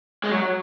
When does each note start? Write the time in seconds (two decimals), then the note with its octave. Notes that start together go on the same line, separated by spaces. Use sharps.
0.24 G#3
0.31 F#3